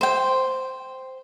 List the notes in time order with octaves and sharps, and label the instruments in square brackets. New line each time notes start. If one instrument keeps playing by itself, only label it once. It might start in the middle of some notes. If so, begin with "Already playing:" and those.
[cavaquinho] C5 G5